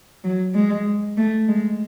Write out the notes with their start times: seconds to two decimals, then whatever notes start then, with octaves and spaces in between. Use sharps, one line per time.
0.24 F#3
0.55 G#3
1.17 A3
1.48 G#3